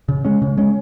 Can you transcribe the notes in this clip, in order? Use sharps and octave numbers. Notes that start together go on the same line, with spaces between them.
C#3
G#3 C#4
C#3
G#3 C#4